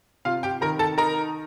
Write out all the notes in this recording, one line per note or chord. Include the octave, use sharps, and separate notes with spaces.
C3 F4 F5
G4 G5
D#3 A#4 A#5
A4 A5
D#4 A#4 A#5